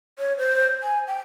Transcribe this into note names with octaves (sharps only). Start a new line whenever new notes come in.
C#5
C5
G#5
G5